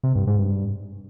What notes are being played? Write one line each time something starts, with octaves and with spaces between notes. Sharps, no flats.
C3
G2
G#2
G2